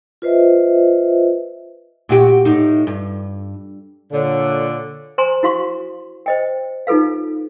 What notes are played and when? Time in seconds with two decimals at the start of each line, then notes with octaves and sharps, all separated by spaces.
0.22 F4 B4 C5 D#5 E5
2.09 A#2 F#4 G4
2.45 A2 D#4
2.87 G2
4.13 A#2 D3 C#5
5.18 C5 G#5 A#5 C6
5.43 E4 F#4 F5 C6 C#6
6.26 C5 D#5 G5
6.87 D#4 F4 A4 B4 F5